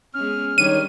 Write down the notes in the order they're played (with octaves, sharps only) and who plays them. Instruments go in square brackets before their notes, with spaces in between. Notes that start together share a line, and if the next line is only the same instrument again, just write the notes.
[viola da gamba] G#3 B3 C#4 [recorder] F6
[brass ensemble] D#3 C#5 [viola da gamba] G3 D4 [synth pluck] D#7